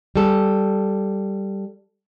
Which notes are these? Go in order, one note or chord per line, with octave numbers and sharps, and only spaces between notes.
G3 A4